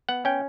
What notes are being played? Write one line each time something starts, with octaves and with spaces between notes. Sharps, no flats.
B3 F#5
C#4 G5